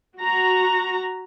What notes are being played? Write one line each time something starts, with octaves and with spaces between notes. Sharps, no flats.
F#4 A#5